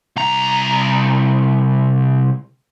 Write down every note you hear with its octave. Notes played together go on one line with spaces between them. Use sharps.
C2 A#5